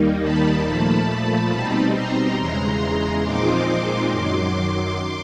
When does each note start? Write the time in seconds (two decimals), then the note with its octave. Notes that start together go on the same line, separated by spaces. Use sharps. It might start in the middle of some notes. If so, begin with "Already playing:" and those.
Already playing: D#2 D#3 G3 A#3 D#4
0.21 A5 B5
0.64 A#2 F3 A3 A5 B5
1.51 B2 G3 C4 D#4
1.94 A#5 C6
2.37 E2 C#3 E3 G#3 A#5 C6
3.23 A#2 F3 G#3 C4 D#4 C6 D6
4.10 F#2 D#3 F#3 C6 D6